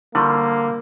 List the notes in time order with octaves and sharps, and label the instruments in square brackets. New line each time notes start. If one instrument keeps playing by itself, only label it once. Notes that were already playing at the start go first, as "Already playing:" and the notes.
[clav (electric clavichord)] D3 F3 G3 [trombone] A#3 [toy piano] E4 C6 C#6